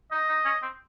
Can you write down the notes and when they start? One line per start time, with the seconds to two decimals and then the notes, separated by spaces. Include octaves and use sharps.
0.11 D#4 D#5
0.29 D#4
0.45 C#4
0.62 C4